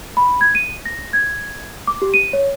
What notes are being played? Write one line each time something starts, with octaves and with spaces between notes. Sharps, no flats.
B5
G#6
D#7
A#6
G#6
D6
G4
D#7
C#5